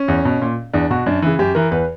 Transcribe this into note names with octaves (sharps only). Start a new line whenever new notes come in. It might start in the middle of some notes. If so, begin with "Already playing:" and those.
Already playing: C#4
E2
B2
A#2
E2 D4
B2 F#4
F#2 D4
C#3 E3
F#2 G4
E3 A#4
E2 B4